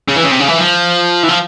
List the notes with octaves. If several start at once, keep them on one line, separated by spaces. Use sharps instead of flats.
C#3
E3
C#3
C3
C#3
E3
F3
E3
F3